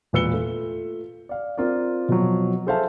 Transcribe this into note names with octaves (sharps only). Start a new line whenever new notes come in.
E1 A#2 B4 E6 C#7 G7
A3 F4
D5 F5
C4 F4 A#4 D5
B2 F3 F#3
G#4 A4 C5 E5 F5 A5